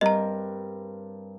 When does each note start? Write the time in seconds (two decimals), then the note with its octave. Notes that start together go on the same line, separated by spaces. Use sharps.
0.01 G2 C4 A#4 D#5 A#5